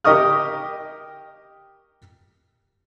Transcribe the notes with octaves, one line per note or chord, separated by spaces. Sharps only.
G4 A#4 D#5 C#6 D#6 F6